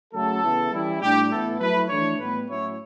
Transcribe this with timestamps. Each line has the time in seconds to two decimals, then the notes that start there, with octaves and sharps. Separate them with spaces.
0.13 C#3 F#3 A3 A4
0.43 C#3 E3 B3 E4
0.71 E3 G3 C#4 E4
1.01 A2 G3 D4 G4
1.31 A2 E3 B3 E4 A4
1.60 F#3 A3 E4 B4
1.89 E3 A3 D4 C#5
2.17 A2 G3 B3 B4
2.47 A2 F#3 C#4 E4 C#5